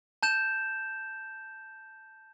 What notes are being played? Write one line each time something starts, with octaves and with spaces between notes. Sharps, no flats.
A5 G6 E7